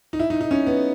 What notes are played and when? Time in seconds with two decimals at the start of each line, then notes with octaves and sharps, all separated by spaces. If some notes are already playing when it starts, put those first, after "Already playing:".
0.13 D#4
0.19 E4
0.30 D#4
0.41 D#4
0.51 C#4
0.66 B3